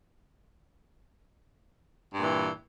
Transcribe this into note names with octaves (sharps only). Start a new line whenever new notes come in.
G2 A#2 E3